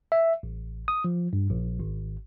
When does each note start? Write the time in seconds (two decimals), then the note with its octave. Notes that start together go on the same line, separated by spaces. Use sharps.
0.12 E5
0.43 A1
0.88 D#6
1.04 F3
1.33 G2
1.50 A#1
1.80 G#1